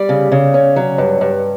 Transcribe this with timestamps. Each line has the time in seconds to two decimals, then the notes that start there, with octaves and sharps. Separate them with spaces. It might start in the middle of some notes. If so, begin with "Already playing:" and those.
Already playing: G3 D5
0.09 C#3
0.32 C#3
0.54 C#4
0.76 F#3
0.98 G2
1.21 G2